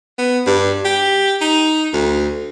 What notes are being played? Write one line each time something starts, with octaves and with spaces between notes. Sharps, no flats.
B3
G2
G4
D#4
D2